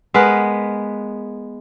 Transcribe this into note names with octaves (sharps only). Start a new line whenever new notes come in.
G#3 B3 A#4 B4